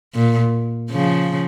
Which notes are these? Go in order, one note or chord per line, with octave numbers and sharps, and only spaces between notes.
A#2
C#3 F3